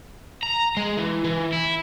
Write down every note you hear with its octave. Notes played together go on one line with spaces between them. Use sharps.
A#5
G#3
E3
E3
E4